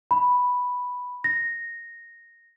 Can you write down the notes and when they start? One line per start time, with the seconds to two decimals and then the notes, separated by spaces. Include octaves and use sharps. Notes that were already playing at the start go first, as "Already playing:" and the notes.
0.11 B5
1.24 A#6